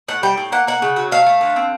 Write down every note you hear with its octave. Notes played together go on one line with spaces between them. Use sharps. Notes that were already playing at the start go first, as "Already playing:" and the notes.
A2 F#5
G3 G5
A2
A#3 F#5
A#3 F#5
C#3
F#3
A3 F5
A3
D3
C4